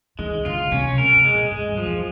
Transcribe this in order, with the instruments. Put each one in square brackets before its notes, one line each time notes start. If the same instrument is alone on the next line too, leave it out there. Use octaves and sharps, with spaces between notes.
[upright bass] D#3 [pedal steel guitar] G#3
[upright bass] D3 [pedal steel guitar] F4
[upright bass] C3 [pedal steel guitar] C#4
[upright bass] C3 [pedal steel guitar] A#4
[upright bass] C3
[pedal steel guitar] G#3
[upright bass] A#2
[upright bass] G#2 [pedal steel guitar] G#3
[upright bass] G2
[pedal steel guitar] F3
[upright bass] F#2